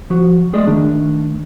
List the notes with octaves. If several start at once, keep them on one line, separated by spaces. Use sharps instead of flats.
F3 F#4
G#3 A3 G#4 D5 D#5
D#3 A3 D4